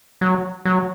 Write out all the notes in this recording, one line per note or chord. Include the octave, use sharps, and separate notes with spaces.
F#3
F#3